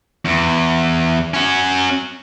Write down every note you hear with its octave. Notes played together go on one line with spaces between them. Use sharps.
E2
C#4 F#4